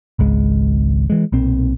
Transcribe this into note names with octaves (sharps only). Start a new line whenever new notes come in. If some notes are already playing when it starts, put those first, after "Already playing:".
G#1 C#2 G#3
E3 G#3
B1 A#2 C4